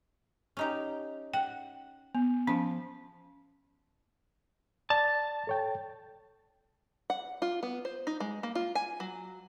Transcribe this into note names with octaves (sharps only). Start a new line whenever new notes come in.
C#4 D#4 G4
F#5 G5
B3
F3 C#4
D5 A5
A4 C#5 G5
F#5
F4
B3
C5
D#4
G#3
A#3
F4
G#5
F#3